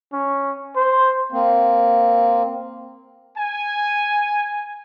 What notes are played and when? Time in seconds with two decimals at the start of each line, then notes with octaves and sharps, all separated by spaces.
0.13 C#4
0.76 C5
1.32 A#3 C4
3.38 G#5